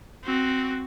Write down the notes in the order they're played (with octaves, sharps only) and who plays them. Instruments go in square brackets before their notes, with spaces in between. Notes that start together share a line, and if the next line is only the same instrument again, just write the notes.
[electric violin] C4 F#4